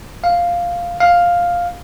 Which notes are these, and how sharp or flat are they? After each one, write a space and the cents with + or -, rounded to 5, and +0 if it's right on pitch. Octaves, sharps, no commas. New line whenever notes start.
F5 +0
F5 +5